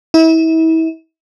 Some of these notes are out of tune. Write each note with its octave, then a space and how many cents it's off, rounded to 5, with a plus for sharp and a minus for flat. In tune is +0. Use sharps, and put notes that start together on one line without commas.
E4 -35